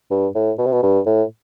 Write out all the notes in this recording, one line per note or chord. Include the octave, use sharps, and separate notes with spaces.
G2
A2
B2
C3
B2
G2
A2